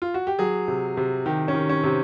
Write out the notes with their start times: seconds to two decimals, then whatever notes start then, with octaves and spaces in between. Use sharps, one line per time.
0.02 F4
0.14 F#4
0.27 G4
0.39 F#3 G#4
0.68 C3
0.97 C3
1.26 D#3 G4
1.48 C#4
1.55 D#3
1.69 C#4
1.84 C3 C4